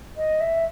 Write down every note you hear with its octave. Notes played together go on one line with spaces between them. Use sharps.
D#5
E5